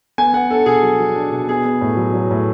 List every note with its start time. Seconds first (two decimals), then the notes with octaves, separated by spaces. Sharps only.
0.18 B3 G#5
0.33 B3 F#5
0.50 D4 A4
0.66 B2 G#4
0.83 F#3
1.00 F#3
1.15 D4
1.31 B2
1.48 B3 G#4
1.65 B3
1.81 A2
1.97 F#3
2.14 F#3
2.31 A2